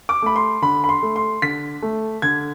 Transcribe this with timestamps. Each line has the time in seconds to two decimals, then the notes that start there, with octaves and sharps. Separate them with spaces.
0.09 D6
0.22 A3 B5
0.36 C6
0.62 D3 B5
0.84 B5
0.89 C6
1.02 A3
1.16 C6
1.42 D3 B6
1.82 A3
2.22 D3 G#6